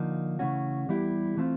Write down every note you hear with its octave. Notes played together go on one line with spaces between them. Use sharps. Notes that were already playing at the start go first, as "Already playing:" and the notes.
Already playing: D3 F3 A#3 D#4
C#3 E3 A3 C#4 F#4
E3 G3 B3 E4 G4
E3 A3 C4 F4